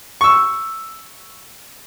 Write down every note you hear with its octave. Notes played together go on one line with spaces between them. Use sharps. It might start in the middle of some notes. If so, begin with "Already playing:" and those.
C#6 E6